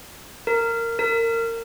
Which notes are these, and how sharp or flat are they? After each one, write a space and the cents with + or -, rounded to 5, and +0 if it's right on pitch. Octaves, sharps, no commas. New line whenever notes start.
A#4 -15
A#4 -25